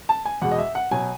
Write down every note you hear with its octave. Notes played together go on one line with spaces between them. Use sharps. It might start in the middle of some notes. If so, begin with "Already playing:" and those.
A5
G#5
E2 B2 G#3 F#5
D#5
E5
F#5
B2 F#3 G#5